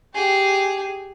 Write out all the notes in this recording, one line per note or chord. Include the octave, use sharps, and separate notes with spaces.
G4 G#4